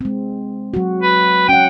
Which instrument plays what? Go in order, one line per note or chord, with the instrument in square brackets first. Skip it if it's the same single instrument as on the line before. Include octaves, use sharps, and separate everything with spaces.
[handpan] G#3 C4
F#3 F#4
[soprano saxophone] B4
[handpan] C#4 F#5 [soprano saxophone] G5